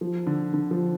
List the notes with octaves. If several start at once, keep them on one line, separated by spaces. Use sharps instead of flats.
F3
D3
D3
F3